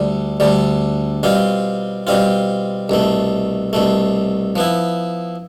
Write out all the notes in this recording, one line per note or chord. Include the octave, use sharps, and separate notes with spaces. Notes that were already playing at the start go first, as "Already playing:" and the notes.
Already playing: D2 D3 G3
D2 D3 G3
B2 G3 C4 F4
B2 G3 C4 F4
C2 B2 A3
C2 B2 A3
F3 B3 E4